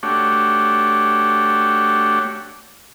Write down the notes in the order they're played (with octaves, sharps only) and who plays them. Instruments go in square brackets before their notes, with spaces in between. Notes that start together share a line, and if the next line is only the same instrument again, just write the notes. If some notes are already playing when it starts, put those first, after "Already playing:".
[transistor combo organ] A3 D4 F#4 G4 C#5